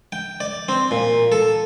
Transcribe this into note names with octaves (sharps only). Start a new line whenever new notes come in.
G5
D5
C4
A#2
A4